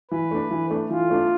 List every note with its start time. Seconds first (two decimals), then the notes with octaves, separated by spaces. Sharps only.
0.11 E3 B4
0.31 A3 D4
0.51 E3
0.71 A3 D4
0.90 E3 F4
1.10 A3 D4